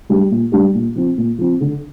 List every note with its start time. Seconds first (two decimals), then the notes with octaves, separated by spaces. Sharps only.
0.09 G3 D4 G4
0.31 A#2
0.52 G3 D4 G4
0.75 A#2
0.96 F3 C4
1.17 A#2
1.38 F3 C4
1.60 D3